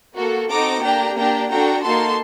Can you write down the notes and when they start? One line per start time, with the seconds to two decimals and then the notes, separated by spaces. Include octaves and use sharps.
0.16 A#3 F#4 A4
0.49 C4 D#4 F#4 A4 A#5 D6
0.83 A#3 D4 G4 G5 A#5
1.16 A#3 D4 G4 G5 A#5
1.50 D4 F#4 A4 G5 A#5
1.83 A#3 D#4 F#4 A4 A5 C6